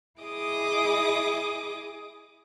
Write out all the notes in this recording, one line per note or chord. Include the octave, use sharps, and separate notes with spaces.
E4 G#4 D#5 D6 D#6